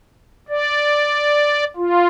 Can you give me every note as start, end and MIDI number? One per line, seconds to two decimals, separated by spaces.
0.49 1.64 74
1.76 2.07 65